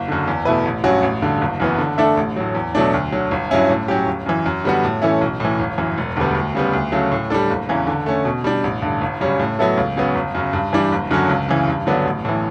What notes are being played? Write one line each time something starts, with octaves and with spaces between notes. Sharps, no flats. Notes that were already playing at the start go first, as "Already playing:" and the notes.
Already playing: F#1
F#2 D3
E2
B2 A3 E4 B4
A1
G2 F#3 C#4 F#4
A1
G2 D3
F#1
F#2 E3 B3
D3
A3 D4 A4 E5
A1
A2 F#3
E2
B2 F#3 A3 D4
D2
D3 F#3
G1
G2 F#3 C#4 E4
A2
F#3 C#4 G4
G1
F#2 E3
F#2
D3 G3 B3 F#4
A2
E3 A3 C#4 E4
B1
A2 E3
G1
F#2 E3
E1
D2 D3 G3 B3
D2
C#3 G3 B3
D2
C#3 F#3 A3
A2
G3 D4 A4
F#1
E2 C#3 E3
D3
A3 C#4
B2
G3 D4
A1
G2 D3
G1
F#2 C#3 G3 C#4
A2
F#3 B3 E4 A4
C#2
C#3 F#3 B3
G1
F#2 C#3
G2
E3 G3 D4
F#1
F#2 D3 F#3 C#4
C#2
C#3 E3
G2
D3 F#3 B3 D4
A1
A2 E3